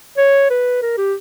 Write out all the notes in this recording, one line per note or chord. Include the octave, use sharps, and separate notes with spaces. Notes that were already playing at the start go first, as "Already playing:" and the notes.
C#5
B4
A#4
G4